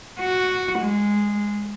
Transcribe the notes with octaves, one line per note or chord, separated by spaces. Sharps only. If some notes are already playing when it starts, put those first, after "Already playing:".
F#4
G#3